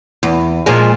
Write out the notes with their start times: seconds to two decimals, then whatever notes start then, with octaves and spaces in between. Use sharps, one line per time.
0.23 E2
0.66 A#2 F3 G#3